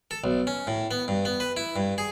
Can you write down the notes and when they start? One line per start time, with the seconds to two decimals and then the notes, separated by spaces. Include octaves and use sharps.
0.11 A4
0.24 B1
0.47 C#4
0.67 A2
0.91 B3
1.08 G2
1.25 B3
1.40 B4
1.57 E4
1.76 G2
1.98 G#4